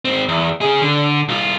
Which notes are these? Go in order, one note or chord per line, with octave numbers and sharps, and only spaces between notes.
G#2 C4
E2
C#4 G#4
D3
C2 F4